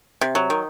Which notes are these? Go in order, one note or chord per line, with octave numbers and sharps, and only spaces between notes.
C3
F#3
D#3